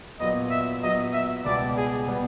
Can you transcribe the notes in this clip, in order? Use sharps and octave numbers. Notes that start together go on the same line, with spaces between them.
A#2 F#3 B3 D#5
E5
A#2 F#3 B3 D#5
E5
C#2 B2 G3 B3 D5
G#4
B2 G3 B3